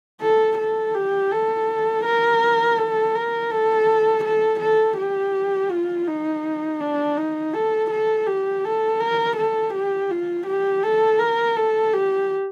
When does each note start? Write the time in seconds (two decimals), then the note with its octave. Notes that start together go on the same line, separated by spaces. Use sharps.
0.21 A4
0.58 A4
0.94 G4
1.31 A4
2.05 A#4
2.78 A4
3.15 A#4
3.51 A4
4.24 A4
4.60 A4
4.97 G4
5.70 F4
6.07 D#4
6.80 D4
7.17 D#4
7.53 A4
7.91 A4
8.27 G4
8.64 A4
9.00 A#4
9.37 A4
9.73 G4
10.11 F4
10.47 G4
10.83 A4
11.19 A#4
11.56 A4
11.93 G4